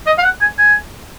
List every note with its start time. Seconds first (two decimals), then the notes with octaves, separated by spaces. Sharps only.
0.07 D#5
0.18 F5
0.23 F#5
0.41 G#5
0.58 G#5